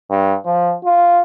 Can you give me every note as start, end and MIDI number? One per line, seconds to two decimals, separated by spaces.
0.10 0.35 43
0.45 0.74 53
0.85 1.20 65